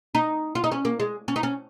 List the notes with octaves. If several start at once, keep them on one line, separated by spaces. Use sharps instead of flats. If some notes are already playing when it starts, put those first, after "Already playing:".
D#4
F4
D#4
C#4
A#3
G#3
C#4
D#4
C#4